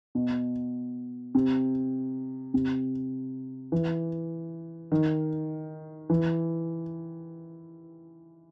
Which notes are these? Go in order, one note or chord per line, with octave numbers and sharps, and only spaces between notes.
B2
C3
C3
E3
D#3
E3